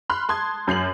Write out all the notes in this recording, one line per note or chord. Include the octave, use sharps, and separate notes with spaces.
B5 C6 F6 F#6
A5 C6 D#6 G#6
F#2 G6 C7 F#7